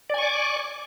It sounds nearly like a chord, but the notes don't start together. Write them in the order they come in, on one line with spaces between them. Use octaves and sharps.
D5 G#5 C#6 D6